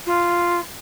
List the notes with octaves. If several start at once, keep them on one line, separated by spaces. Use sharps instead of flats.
F4